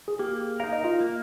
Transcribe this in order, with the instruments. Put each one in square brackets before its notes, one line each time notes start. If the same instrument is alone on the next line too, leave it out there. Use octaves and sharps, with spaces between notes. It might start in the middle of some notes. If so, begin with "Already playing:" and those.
[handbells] G#4
[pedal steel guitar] A#3 [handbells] G4
[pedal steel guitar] D#4 A#4 [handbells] F5
[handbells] D#5
F4 F5
[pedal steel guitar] A#3